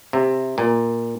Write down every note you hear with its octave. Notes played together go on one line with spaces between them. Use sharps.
C3
A#2